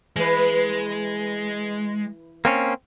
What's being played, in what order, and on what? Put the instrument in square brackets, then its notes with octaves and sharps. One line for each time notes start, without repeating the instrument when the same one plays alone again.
[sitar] E3 B4 [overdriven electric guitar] G#3
[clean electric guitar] A#3 C4 C#4